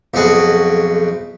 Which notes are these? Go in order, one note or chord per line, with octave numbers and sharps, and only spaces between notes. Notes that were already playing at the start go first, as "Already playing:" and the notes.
B1 F2 F#4 G#4 A5 B5